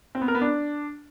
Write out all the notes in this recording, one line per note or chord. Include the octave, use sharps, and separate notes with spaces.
C4
B3
A#4
B3
D4